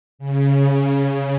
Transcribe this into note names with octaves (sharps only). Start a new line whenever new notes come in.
C#3